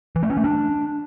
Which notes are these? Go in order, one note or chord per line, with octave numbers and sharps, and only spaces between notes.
E3
A3
C#4
A3
D4